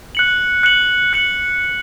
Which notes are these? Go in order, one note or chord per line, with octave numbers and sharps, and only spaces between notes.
F#6 C#7 F#7
F#6 C#7 F#7
F#6 C#7 F#7